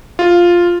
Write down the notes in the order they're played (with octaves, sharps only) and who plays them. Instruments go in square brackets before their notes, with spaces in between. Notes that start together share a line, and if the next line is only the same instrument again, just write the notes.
[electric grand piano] F4